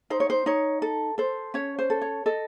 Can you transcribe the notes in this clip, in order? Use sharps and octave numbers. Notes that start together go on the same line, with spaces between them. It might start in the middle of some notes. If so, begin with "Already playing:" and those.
D#4 C5
C#5
C5
D#4 C#5
A4
A4 C5
C#4 C#5
C5
A4
C#5
A4 D#5